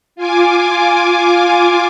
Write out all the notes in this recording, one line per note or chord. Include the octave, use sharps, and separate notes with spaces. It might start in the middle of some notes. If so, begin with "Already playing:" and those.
F4 G#5 D6